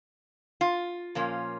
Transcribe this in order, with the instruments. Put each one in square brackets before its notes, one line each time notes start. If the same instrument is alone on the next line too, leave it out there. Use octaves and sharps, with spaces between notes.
[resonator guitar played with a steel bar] F4
A#2 F3 A#3 C#4